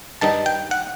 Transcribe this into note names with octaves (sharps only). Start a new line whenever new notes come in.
G2 D#3 G3 D#4 A5
G5
F#5